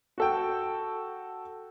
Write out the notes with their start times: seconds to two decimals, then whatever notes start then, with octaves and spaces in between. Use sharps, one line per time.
0.18 F#4 A4 G5